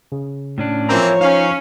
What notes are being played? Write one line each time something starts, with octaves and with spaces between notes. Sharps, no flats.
C#3
A2 C#4 D4
E3 F3 A#3 C4 C#5 A#5
C#4 D#4 F5